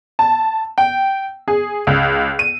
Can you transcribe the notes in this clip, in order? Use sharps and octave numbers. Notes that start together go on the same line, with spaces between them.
A5
G5
G#4
C#2
D#7